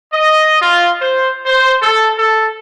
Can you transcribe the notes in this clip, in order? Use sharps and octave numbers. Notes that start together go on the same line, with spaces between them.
D#5
F4
C5
C5
A4
A4